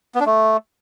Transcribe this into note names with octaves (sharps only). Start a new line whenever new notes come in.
B3
D4
A3